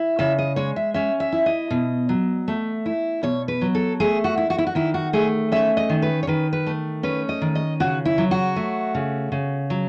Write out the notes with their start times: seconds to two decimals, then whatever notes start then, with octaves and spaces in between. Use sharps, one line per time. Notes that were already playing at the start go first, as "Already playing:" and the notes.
Already playing: E4
0.19 C#3 E5
0.38 D#5
0.56 G#3 C#5
0.76 E5
0.94 C#4 E5
1.20 E5
1.32 E4
1.46 D#5
1.70 B2
2.09 F#3
2.48 A3
2.86 E4
3.23 B2 C#5
3.48 B4
3.61 F#3
3.75 A4
4.00 A3 G#4
4.24 F#4
4.37 E4
4.50 F#4
4.58 E4
4.67 F#4
4.75 D#3 E4
4.94 F#4
5.13 A3 G#4
5.52 C#4 E5
5.77 D#5
5.89 D#3
6.02 B4
6.23 C#5
6.27 D#3 B4
6.53 B4
6.67 A3
7.03 C#4 B4
7.29 D#5
7.42 D#3
7.55 D#5
7.80 C#3 F#4
8.05 E4
8.18 F#3
8.31 F#4
8.56 A3
8.95 C#3
9.32 C#3
9.70 F#3